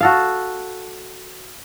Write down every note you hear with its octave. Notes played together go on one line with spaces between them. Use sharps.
F#4 A4 F5